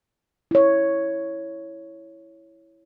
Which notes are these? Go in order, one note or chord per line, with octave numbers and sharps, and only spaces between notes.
E4 C#5